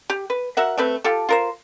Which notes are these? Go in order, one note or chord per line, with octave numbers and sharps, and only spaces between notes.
G4
B4
F#4 A#4 E5 F#5
A3 C4 B4
F4 G4 A4
F4 A#4 C5